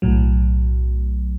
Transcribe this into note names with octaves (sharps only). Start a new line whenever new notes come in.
B1 A2 F#3